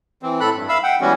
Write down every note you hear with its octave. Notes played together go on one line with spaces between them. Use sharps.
E3 C4
A2 A4 B5 F#6
G2
E5 F5 B5 E6
F#5 G5
E3 G3 G#3 B3 C#4 F#4